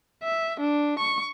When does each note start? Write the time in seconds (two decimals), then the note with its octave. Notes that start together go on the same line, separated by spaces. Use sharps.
0.23 E5
0.60 D4
0.99 C#6